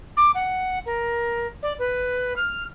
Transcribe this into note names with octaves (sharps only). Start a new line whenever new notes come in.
D6
F#5
A#4
D5
B4
F6